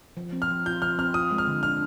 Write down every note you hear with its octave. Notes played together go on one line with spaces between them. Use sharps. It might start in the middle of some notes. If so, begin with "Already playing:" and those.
F3
C4
F6
F3
F4 G6
F3 F6
C4 F6
F4 D#6
G#3
F6
D3
D4 F6